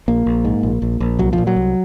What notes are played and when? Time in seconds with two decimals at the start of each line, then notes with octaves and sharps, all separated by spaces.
0.08 A#1 A#3
0.26 A#1
0.45 G#2
0.63 A#1
0.82 A#1
1.00 A#1
1.19 C2 F#3
1.33 F3
1.38 A#2
1.47 F#3
1.56 C2